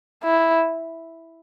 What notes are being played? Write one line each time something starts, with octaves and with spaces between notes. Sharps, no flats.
E4